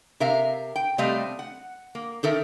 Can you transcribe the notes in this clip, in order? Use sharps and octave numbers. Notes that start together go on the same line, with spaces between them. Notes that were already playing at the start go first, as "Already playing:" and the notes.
C3 A#4 E5 F5
G5
C3 G3 A3 C4 D#5 F5
F#5
A#3
D#3 A4 A#4 E5